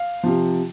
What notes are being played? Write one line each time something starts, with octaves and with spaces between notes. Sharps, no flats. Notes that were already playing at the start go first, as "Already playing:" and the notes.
Already playing: F5
C3 F3